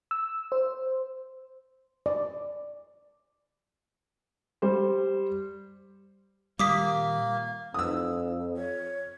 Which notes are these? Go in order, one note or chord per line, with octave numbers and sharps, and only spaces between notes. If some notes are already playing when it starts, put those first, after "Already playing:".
E6
C5
D5
G3 C5
A#2 D#3 G3 A#3 D6 D#6 B6
F2 D#6 E6
C#5